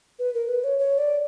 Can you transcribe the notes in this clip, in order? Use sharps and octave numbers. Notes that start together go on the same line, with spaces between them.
B4
A#4
B4
C#5
C#5
D5